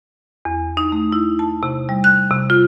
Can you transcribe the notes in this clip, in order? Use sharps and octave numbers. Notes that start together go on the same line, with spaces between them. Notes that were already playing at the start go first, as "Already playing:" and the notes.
E2
D#4
A3
E4
A5
C3
G3
F#6
C3
F4